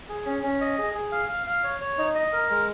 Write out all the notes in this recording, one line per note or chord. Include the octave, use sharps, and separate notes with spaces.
G#4
C#4
C#4
D#5
G#4
G#4
F5
F5
F5
C#5
C#5
D#4
D#5
A#4
G#3